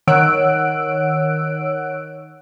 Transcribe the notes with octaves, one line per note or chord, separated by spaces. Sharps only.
D#3 C#5 F#5 E6 F#6 D7